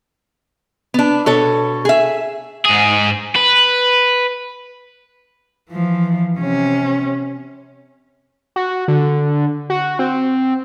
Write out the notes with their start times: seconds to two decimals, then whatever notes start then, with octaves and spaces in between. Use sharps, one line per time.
0.94 B3 D4
1.26 B2 A4 C#5
1.85 G#4 E5
2.65 G#2 G#4
3.36 B4
5.70 E3 F3
6.39 C3 C#4
8.56 F#4
8.88 D3
9.70 F#4
9.99 C4